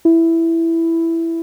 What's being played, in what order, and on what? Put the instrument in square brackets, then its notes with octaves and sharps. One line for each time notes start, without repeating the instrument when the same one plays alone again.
[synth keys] E4